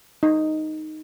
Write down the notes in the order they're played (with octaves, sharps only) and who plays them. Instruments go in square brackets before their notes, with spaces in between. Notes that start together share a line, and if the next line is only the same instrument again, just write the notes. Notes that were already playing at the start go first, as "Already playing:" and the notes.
[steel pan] D#4